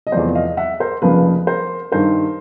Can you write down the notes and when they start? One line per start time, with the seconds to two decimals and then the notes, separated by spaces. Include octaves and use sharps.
0.07 D#5
0.12 E2 C3 F3 A3 C5 D5
0.35 D#5 F5
0.57 E5 F#5
0.80 A#4 C5
1.02 F1 F2 C#3 F3 A#3 B4
1.47 A#4 C5
1.92 G2 D#3 G3 A#4 C5